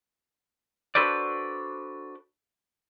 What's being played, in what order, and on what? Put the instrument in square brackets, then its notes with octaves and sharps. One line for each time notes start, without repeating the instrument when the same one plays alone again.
[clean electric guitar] D4 F#4 A4 B4 C5 D5